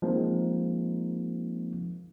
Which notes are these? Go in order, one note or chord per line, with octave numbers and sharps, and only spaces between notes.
F3 G#3 A#3 C4 D#4